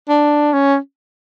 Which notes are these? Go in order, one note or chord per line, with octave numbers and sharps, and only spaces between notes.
D4
C#4